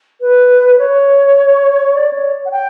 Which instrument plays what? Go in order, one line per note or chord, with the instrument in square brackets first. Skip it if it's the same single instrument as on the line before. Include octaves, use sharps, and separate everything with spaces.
[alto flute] B4
C#5
D5
C#5
F#5
G5